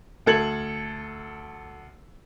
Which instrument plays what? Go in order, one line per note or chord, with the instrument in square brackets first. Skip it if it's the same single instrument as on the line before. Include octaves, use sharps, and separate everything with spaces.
[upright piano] D2 A4 G#6 F#7